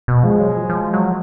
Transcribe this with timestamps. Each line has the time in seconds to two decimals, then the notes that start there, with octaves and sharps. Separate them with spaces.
0.08 B2
0.24 F3 G#3
0.39 F#3
0.55 F3
0.69 F3
0.94 F#3